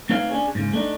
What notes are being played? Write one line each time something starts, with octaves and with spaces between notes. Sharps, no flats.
A3 C4 D#4 B4 C#5 F5
C#4 D4 G#4
G#2 C#3
A3 D4 D#4